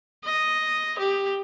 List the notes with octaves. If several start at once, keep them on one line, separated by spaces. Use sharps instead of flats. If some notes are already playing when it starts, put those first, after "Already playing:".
D#5
G4